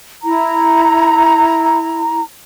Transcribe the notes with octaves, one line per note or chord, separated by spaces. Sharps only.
E4 A#5